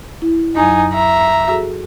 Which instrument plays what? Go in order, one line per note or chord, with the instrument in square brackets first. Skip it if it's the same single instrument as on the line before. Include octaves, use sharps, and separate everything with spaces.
[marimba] E4
[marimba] F#2 F#3 [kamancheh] D#4 G#5
[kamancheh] E5 A#5
[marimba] F#4 G#4 A4